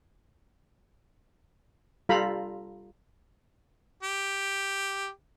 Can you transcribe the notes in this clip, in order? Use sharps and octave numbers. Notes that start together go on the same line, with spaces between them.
G3 F4 A4 F5 A#5 B5
G4